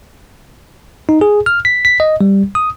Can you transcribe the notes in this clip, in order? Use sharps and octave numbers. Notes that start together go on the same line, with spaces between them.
D#4
G#4
F6
B6
B6
D#5
G3
D#6